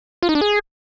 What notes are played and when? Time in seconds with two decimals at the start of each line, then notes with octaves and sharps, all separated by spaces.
0.23 F4
0.29 D#4
0.35 D4
0.41 G#4